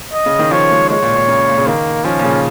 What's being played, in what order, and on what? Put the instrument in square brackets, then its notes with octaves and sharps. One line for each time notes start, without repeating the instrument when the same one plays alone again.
[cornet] D#5
[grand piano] C#3
D#3
[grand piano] F3 [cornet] C#5
[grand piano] G#3
[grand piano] G#3 [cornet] C#5
[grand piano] A#2
A#2
C#3
A#2
C#3
[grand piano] D#3 [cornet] A#3
[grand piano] F3 [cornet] C#4
[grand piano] A#2
C#3